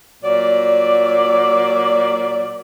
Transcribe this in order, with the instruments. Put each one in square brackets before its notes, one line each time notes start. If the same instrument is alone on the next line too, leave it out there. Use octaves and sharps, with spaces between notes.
[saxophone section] A#2 F#3 D5